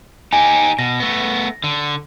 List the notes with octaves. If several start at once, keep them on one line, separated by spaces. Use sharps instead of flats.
D#4 G4 G#5
B2 A#6
A3 B3
D3